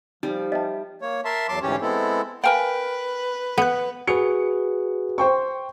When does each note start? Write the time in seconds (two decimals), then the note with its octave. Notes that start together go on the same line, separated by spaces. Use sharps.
0.23 F3 G3 D#4
0.52 D#5 E5 G5 A5
1.02 A#3 C#5
1.25 A#4 E5 A5 C6
1.49 E2 F#3 A5 C6 D6
1.62 D2 G#2 E3 C#4 G4 C#5
1.82 G#3 B3 C4 E4 A4
2.44 A#4 B4 F5 G5 G#5 A#5
3.58 B3 F#5 F#6
4.07 F#4 G#4 B4 C#7
5.18 C5 G5 C#6